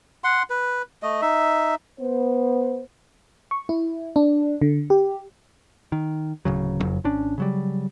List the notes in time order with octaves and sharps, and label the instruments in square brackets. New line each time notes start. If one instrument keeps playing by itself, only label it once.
[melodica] F#5 C6
B4
A3 D#5
D#4 E5
[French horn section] B3 C5
[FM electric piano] C#6
E4
D4
D3
G4
[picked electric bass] D#3
D1 C#3 F#3
F#1 F2 C#3 F#3
G#1 C#4 D4
C#3 F#3 G3